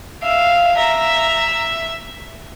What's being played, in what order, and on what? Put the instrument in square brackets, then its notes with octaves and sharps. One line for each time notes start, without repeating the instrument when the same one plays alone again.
[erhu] E5 [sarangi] F5
[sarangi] E5 [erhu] A#5